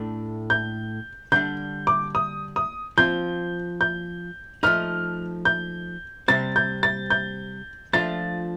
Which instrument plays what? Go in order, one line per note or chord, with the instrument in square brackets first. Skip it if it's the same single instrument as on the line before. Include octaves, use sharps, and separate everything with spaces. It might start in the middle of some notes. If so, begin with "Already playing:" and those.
Already playing: [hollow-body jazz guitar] A2 A3 D4
[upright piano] G6
[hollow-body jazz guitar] D3 G3 D4 [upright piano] G6
[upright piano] D6
D#6
D#6
[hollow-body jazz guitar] F3 C4 F4 [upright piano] G6
[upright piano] G6
[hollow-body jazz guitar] F3 A3 D#4 [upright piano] F6
[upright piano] G6
[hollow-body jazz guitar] C3 G3 C4 [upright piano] A6
[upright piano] G6
A6
G6
[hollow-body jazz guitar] F3 A3 D4 F4 [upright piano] A6